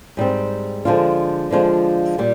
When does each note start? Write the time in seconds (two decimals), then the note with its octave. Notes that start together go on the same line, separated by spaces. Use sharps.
0.17 G#2 G3 C4
0.85 D3 F3 G#3 D4 F4
1.51 D3 F3 G#3 D4 F4
2.18 A#2 G3